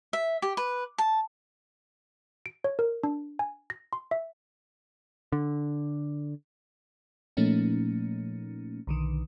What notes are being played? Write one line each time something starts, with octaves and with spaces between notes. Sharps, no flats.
E5
G4
B4
A5
D7
C#5
A#4
D4
G#5
A#6
C6
E5
D3
A#2 F3 A3 A#3 C#4 D#4
B1 D3 D#3